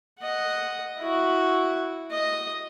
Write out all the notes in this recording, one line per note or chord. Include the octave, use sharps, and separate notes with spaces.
D#5 F#5
E4 F#4
D#5